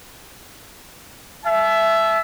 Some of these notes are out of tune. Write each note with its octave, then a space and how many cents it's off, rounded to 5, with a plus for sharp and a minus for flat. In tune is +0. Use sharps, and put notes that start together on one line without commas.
E5 +10 A5 -35